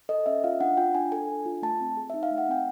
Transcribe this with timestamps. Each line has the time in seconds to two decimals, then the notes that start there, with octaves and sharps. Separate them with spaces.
0.09 A4 D#5
0.26 C#4 E5
0.44 F4 F5
0.61 D4 F#5
0.77 F4 G5
0.95 D4 G#5
1.12 A4 G#5
1.29 D4
1.46 F4
1.62 A3 A5
1.80 C4
1.97 G#4
2.10 D#4 E5
2.23 F5
2.31 A3
2.38 F#5
2.48 C4 G5